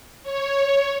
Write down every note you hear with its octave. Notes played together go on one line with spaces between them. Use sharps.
C#5